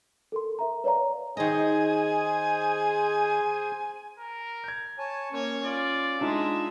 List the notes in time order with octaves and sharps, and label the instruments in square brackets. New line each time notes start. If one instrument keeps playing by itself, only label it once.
[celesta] A4 A#4 C6
A#4 E5 A#5
B4 C#5 D5 F5 A#5
[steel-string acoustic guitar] D#3 D#5 [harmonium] G#4 C5 [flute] G#5
[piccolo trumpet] A#4
[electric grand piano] G6 G#6
[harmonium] C#5 G#5 A5 [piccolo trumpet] C#6
[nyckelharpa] A#3 C#5 [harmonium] C#4
[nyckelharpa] F4 [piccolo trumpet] D5
[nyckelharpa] G#3 E5 [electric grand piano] D4 D#4 F4